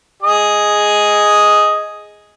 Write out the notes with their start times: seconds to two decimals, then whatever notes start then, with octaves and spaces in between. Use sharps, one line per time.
0.22 G#4 D#5